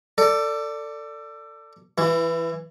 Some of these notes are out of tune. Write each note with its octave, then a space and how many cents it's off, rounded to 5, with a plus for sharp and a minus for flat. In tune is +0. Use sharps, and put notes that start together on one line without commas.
A4 +25 D5 +0
E3 +0 E4 +25